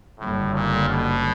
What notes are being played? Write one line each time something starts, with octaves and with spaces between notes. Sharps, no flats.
F#1 F#2 A2 D3 G3
A#2
B2